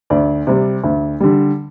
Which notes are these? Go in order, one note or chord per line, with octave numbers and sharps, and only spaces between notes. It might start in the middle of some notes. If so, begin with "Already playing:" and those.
D2 D5
C3 G3
D2
D3 G3